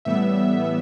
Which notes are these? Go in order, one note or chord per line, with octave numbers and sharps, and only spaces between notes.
A2 E3 G3 B3 E5
A2 E3 G3 B3